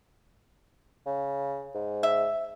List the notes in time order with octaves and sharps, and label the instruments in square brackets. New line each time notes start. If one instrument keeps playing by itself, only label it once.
[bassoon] C#3
G#2
[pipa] E5